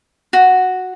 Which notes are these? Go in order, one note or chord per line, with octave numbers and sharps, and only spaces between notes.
F#4